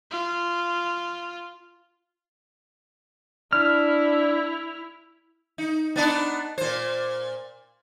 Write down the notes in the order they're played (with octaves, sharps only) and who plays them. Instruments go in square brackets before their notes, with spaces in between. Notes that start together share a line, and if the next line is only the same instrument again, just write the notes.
[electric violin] F4
[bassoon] D4 [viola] E4 [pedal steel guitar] F6
[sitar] D#4
B3 D4 D#4
A#2 C5